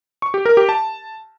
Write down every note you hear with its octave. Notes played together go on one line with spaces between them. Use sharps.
C#6
G4
A#4
G4
A5